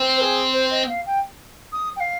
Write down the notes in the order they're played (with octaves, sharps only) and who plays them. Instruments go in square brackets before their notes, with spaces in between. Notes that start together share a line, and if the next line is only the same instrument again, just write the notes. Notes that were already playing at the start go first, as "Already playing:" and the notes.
Already playing: [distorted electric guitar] C4
[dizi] C5
G#4
C5
D#5
F5
G5
D#6
G5
F5